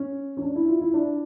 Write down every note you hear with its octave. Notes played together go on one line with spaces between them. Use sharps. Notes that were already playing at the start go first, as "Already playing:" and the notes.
Already playing: C#4
C#4
D4
E4
F4
E4
D4